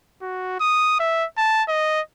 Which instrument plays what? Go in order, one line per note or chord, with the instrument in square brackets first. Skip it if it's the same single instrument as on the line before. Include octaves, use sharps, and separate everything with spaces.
[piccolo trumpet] F#4
D#6
E5
A5
D#5